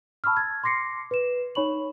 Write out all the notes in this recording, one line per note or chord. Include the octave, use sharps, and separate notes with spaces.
A5 B5 C#6 E6 F6
G#6 A6
C6 D6 A#6 C7 C#7
B4 E7
D#4 C#5 B5 C#6 F#7